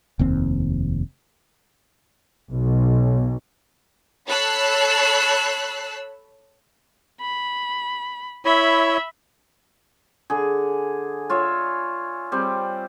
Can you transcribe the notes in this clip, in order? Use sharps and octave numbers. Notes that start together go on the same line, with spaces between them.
F1 D#2 C4
B1
A4 C#5 B5 E6 F#6 C7
B5
E4 C#5 E5 B5
D3 G#4
F4 C#5 E5
G3 C4